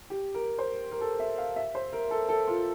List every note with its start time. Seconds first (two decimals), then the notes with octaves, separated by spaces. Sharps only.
0.10 G4
0.34 A#4
0.59 C5
0.92 A#4
1.01 A4
1.20 E5
1.38 F5
1.56 E5
1.75 C5
1.93 A#4
2.11 A4
2.29 A4
2.48 F4